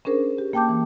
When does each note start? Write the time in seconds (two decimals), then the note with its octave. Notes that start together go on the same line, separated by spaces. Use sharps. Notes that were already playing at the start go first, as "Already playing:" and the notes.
0.05 C#4 D4 G#4 A#4 C5
0.38 G4
0.53 A#3 G5 A5 D6 G6
0.69 E3